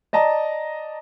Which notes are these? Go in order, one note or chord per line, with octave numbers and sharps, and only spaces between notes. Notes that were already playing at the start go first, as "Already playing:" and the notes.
D5 D#5 A5 A#5